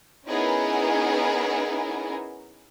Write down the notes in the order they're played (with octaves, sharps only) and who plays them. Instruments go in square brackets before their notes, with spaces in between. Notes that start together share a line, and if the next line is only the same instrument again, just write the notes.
[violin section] B3 C#4 D#4 E4 G#4 A#4